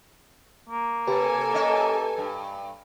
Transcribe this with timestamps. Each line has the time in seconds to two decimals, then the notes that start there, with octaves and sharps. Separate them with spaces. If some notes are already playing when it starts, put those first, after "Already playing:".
0.69 A#3
1.07 C3 G4 A4 B4 G#5
1.54 C#4 D#5 E5
2.18 G2